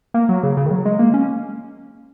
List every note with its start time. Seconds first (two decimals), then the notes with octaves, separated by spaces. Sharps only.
0.14 A#3
0.29 F#3
0.43 C#3
0.57 C#3
0.66 D#3
0.71 F#3
0.85 G#3
0.99 A#3
1.14 C#4